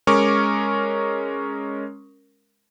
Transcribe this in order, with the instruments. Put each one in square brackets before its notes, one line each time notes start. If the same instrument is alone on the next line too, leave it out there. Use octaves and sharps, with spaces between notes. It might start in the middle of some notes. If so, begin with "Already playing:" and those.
[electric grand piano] G#3 C#4 A#4 C#6 D6